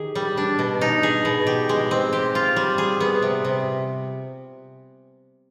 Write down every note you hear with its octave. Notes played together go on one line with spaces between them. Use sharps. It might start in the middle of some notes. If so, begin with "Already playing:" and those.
Already playing: D#3 G4 G#4
G3
D4
B2
D#4
G#4
B2
G4
G#3
C4
G4
F4
G3
G#4
B3
C3
C3